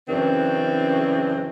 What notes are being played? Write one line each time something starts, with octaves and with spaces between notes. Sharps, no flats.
F#2 C#3 E3 C4 D4